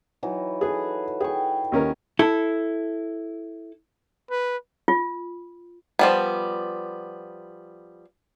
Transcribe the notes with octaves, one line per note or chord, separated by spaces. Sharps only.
E3 F#3 D#4
G#4 A4 B4
G#4 G5 C#6
D#2 C#4 A#4
E4 A4
B4
F4
F3 G3 B3